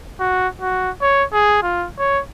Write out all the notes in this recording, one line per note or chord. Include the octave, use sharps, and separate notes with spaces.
F#4
F#4
C#5
G#4
F4
C#5